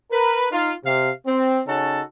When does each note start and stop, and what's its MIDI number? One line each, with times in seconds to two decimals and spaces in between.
0.11 0.47 70
0.11 0.47 71
0.51 0.71 63
0.51 0.71 65
0.84 1.10 48
0.84 1.10 77
1.26 1.60 60
1.66 2.00 49
1.66 2.00 61
1.66 2.00 63
1.66 2.00 66
1.66 2.00 69
1.66 2.00 81